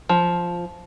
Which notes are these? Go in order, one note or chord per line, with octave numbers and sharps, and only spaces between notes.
F3